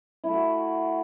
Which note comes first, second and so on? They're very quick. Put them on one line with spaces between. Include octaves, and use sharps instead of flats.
E4 A3 F#4